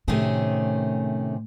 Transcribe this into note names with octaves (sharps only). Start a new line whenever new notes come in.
A2 C3 D#3 A3 C#4 G#4